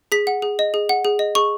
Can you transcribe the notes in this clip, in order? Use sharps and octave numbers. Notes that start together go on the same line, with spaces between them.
G#4 B6
F#5
G#4
D#5
G#4
F#5
G#4
D#5
G#4 C#6